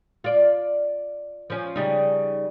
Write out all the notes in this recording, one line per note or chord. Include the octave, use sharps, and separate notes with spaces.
F4 D5
F3 C#4
C#3 G3 D#4